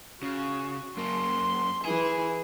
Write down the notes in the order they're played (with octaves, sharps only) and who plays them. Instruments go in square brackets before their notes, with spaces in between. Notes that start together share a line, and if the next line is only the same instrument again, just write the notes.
[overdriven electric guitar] C#3 [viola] F#4
[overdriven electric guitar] F#2 A#3 [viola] C6
[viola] E3 E4 [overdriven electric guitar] G#4